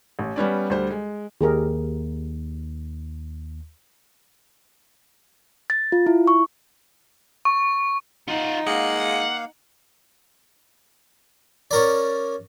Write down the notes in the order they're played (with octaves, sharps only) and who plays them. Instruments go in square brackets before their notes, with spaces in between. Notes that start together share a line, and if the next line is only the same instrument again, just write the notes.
[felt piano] A1
G3 B3 C#4 D5
D2 G3 C5
G#3
[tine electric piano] D#2 [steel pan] G4 G#4 A#4
[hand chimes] A6
F4
E4
C#6
[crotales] C#6
[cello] D#4 [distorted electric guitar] F4 F#5
[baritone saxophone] G#3 [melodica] A#3 F5 [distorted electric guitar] F#5
[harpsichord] C#4 A#4 D5